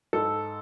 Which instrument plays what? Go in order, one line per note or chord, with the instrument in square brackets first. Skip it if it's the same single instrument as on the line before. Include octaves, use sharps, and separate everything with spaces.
[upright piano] G#2 A4